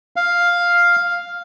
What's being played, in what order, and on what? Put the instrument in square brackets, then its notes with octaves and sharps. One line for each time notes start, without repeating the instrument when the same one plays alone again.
[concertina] F5